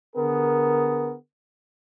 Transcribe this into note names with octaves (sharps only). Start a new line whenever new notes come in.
D3 B3 G#4 A#4